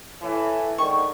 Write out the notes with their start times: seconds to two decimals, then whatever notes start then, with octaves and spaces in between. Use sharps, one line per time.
0.20 A2 E3
0.78 G#2 D3 D#3 C#6